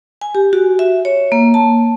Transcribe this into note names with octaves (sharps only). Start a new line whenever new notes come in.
G#5
G4
F#4
E5
C#5
A#3
A5